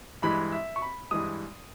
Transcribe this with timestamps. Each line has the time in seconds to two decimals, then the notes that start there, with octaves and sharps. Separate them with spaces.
0.22 G2 E3 G#3 B5
0.52 E5
0.76 C#6
0.82 B5
1.11 G2 E3 G#3 D#6